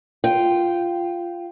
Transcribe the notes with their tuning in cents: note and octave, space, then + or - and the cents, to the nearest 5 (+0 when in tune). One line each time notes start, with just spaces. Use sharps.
F4 -5 G5 -10